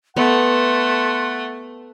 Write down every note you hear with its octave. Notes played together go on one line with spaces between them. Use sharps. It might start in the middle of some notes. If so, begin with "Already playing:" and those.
A3 B3 F#5 C6